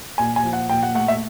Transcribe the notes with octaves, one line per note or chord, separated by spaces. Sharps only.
A#2 G#5
G#5
F3
F#5
A#2 G5
F#5
A3 F#5
E5